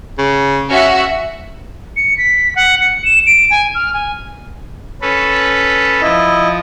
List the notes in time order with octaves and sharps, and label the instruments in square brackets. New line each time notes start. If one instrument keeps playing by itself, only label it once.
[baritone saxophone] C#3
[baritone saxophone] C#4 [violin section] F#4 E5 F#5
[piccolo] C#7
B6
F#5
C#7
E7
D7
G#5
F6
G#5
[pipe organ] C#4 A4 B4
[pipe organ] F3 [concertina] E4 D#5